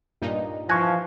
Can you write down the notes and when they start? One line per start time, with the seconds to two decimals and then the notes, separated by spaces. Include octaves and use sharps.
0.22 G2 A#2 D#4
0.69 E3 F3 G#5 C#6 F#6 G#6 A#6